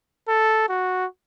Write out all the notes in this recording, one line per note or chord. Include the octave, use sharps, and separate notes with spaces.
A4
F#4